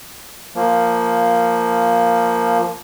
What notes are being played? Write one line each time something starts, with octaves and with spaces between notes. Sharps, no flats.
F3 A#3